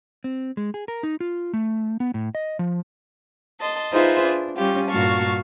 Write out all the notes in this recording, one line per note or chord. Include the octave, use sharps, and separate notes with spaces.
C4
G#3
G#4
A#4
D#4
F4
A3
B3
A2
D#5
F3
D#5 A5 C6
D#4 F4 G#4 B4 C5 E5
D4
G3 C#4 F4 G4
G2 A#2 F#4 F5 A5 C#6